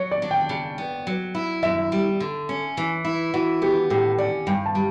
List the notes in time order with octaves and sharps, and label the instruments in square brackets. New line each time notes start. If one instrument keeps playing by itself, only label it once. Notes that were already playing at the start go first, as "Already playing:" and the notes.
Already playing: [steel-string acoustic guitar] F#3 [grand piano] C#5
[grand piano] D5
[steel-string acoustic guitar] D4
[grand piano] G5
[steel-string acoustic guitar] C#3
B3
F#3
E4
[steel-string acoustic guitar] F#2 [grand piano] E5
[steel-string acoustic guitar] G3
D3
C#4
E3
E4
[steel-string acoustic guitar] E3 [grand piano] F#4
[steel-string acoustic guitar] B3 [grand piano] G4
[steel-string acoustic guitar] A2 [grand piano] G4
[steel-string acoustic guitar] C#4 [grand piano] D5
[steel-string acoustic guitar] G2 [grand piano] G5
[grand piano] A5
[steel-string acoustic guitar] G3